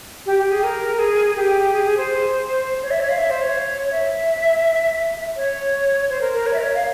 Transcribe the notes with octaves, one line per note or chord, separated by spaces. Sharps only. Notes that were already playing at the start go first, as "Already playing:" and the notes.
G4
G4
G#4
A#4
G#4
G4
G#4
G#4
C5
C#5
E5
C#5
F5
E5
C5
C#5
E5
C#5
C5
A#4
A#4
C#5
E5
C#5
F5